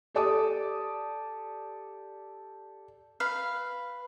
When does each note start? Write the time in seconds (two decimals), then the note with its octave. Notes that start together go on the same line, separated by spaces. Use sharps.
0.15 G4 A4 D5 A5 D6 D#6
3.20 B4 F5